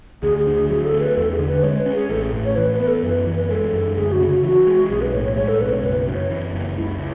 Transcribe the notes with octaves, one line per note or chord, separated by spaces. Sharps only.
D2 G#4
G#4
D3
G#4
F#3 G#4
A4
A3
B4
E2 A4
G#4
D3
B4
G#3 C#5
B4
C#4
G#4
A1 A4
G#4
A2
C#5
E3 B4
B4
B3
A4
F#2 B4
E3
B4
G#3 A4
F#2
D2 G#4
F#4
C#3
F#4
E3 F#4
G#3
B1 G#4
B4
A2 C#5
C#5
G#3 C#5
A4
B1 B4
C#5
F#1 B4
B4
F#2
C#5
E3
F#1
C#2 E4